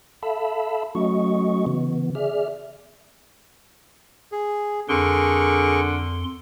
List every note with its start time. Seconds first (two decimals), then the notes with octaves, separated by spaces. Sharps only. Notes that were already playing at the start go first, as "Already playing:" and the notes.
0.23 A4 E5 F5 A5 B5 E6
0.95 F#3 A3 C#4 F#4 D#5 C#6
1.67 C#3 E3 B3
2.15 G#4 D5 E5 F6
4.32 G#4
4.89 F2 D3 G#4 A#4 C6 C#6